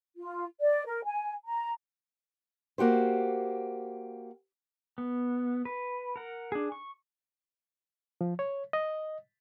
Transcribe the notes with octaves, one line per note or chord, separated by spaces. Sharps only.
F4
D5
A#4
G#5
A#5
A#3 F#4 G4 C5
B3
B4
A#4 F#5
D4 G#4
C#6
F3
C#5
D#5